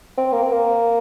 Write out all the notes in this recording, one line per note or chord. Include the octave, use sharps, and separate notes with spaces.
C4
A#3
C4
A#3